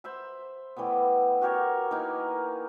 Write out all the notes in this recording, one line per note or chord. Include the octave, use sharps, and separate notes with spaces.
C5 E5 B5
E3 G3 A3 B3
F#4 G4 A#4 C#5
E3 A#3 D#4